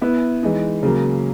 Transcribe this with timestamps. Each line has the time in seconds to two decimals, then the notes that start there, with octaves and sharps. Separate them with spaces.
0.01 B3 E4 B4 E5
0.43 E3 G#3 D#4
0.83 C#3 F#3 A#3